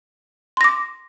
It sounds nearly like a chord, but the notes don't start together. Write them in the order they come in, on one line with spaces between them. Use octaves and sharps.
C6 A#6 D6